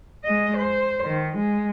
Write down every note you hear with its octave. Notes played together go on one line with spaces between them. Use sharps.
G#3 D#5
C5
D#3
G#3